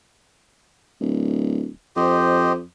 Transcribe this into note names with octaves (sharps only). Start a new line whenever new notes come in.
D1
F2 G4 C5 D#5